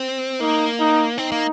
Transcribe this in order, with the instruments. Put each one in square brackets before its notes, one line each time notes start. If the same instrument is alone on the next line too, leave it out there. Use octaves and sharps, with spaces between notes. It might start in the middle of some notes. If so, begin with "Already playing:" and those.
Already playing: [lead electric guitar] C4
[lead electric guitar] A#3 [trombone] D#4
[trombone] D#4
[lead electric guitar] C4 [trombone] D#4
[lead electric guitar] A#3